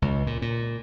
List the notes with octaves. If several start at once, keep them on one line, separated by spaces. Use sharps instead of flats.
C#2
A#2
A#2